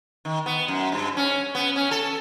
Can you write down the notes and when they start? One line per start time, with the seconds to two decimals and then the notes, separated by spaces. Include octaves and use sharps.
0.25 D#3
0.46 B3
0.68 F#2
0.92 G2
1.17 C#4
1.55 B3
1.76 C#4
1.91 A4